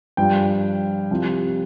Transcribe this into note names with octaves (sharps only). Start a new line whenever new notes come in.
G2 F3 G5
C2 C3 F3